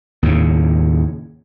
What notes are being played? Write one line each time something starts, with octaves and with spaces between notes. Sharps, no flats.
D#2 A2 C#3